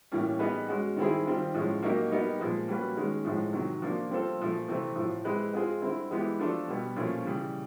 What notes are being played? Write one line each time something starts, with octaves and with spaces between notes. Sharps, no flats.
A2 E3 G3 A#3 C#4
G3 B3 D#4 G#4 B4
G#3 C#4 F#4
D#3 G3 C4 E4 G#4
D#3 G3 C4 F4
A2 F3 G#3 C#4
F#3 A#3 D#4 G4 A#4
G3 B3 D#4 G4 A#4
A#2 F3 G#3
G3 A#3 C#4 F#4 B4
D#3 G#3 C#4
A2 F3 G#3
C3 D#3 F#3
F3 A#3 D4 F4
G3 C4 F4 A4 C5
A#2 F3 A3
C3 E3 A3 C4
A2 F3 A3
G#3 C4 E4 G4 B4
G#3 C4 F4 G#4
D3 G3 C4 E4
E3 G#3 B3 E4 G4
F3 A3 D4 F4 A4
B2 G3 B3
A#2 F3 A3 C#4
C#3 E3 G3